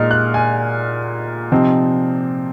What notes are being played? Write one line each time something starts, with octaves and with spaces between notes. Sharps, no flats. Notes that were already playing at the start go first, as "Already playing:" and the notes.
Already playing: A#2 G#3 D#4 F6
F#6
G#5
C3 F3 C4 D#4